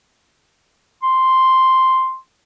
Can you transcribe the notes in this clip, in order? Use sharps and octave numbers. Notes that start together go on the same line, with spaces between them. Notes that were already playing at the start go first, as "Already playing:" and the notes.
C6